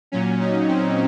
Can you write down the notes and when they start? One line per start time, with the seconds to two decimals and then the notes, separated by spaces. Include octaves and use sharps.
0.12 A#2 F#3 C#4
0.40 D#4
0.68 C4